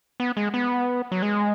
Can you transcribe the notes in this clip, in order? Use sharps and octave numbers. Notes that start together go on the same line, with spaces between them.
B3
G#3
B3
F#3
G#3